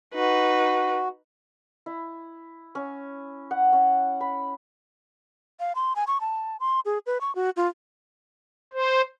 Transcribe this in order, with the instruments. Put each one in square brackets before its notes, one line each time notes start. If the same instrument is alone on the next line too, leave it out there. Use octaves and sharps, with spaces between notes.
[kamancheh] D#4 B4 [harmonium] F#4
[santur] E4
C#4
F#5
C#4
B5
[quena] F5
C6
G#5
C#6
A5
C6
G#4
B4
C#6
F#4
F4
[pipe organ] C5